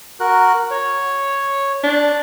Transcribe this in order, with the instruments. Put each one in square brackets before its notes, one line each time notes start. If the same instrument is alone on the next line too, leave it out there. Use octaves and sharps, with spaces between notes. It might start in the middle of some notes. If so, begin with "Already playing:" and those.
[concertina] F#4 A#4 F#6
C#5
[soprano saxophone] D4